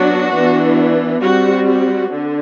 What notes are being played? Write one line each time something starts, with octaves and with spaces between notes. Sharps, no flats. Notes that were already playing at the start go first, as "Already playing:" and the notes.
Already playing: F#3 B3 D4 F#4
E3 B3 D4
G3 C4 F#4
F#4
D3